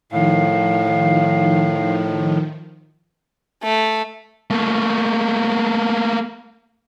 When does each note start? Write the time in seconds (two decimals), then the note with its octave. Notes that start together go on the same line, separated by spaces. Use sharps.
0.12 A2 D#3 F3 F5
3.64 A3
4.50 A3 A#3